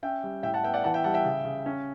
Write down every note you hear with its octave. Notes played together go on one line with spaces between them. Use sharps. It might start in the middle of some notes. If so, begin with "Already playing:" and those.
C#4 E5 G5
G3
A2 E5 G5
F#5 A5
B3 E5 G5
D5 F#5
E3 F#5 A5
E5 G5
G3 F#5 A5
E5 G5
C#3
C#3
C#4